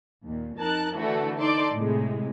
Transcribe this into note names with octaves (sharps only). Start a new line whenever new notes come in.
D#2 A#2
F2 D#4 A#4 A5 F#6
D3 E3 A3 D4 F#4 A4
D#4 A4 D5 A5 C6 D6
A2 C3 G#3